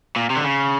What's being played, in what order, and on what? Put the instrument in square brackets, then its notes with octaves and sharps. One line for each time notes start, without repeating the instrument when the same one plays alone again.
[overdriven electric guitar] A#2
C3
D3
C#3